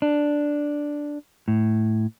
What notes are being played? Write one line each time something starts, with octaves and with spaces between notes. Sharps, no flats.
D4
A2